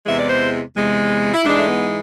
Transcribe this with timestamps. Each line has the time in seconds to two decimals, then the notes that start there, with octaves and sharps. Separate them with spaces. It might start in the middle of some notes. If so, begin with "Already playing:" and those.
0.05 E2 C3 E3 G#3 E5
0.19 D5
0.29 C5
0.75 E2 C3 G#3
1.34 E4
1.45 G#2 E3 G#3 D4
1.57 A3
1.68 B3